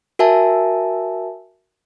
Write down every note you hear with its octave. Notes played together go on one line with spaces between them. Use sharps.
F#4 A#4 E5 G#5 A5